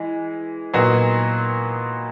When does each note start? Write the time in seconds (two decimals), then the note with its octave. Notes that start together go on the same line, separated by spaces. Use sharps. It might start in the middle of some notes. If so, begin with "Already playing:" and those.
Already playing: E3 G#3
0.73 A#2 F#3 B3 D#4 F#4